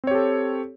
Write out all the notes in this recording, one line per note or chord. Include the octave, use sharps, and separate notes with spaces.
C4 G4 A4 C#5